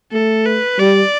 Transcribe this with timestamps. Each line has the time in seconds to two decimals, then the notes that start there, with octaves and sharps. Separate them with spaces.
0.13 A3 A4
0.46 B4
0.79 G3 D5